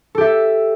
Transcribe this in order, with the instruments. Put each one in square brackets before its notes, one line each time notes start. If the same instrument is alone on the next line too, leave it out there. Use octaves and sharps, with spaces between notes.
[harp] A4
G4
E5